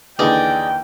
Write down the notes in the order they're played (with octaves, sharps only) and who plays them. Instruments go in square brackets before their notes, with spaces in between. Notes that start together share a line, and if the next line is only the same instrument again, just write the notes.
[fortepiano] D#2 D3 E3 [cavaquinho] G#4 D5 D#5 [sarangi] G5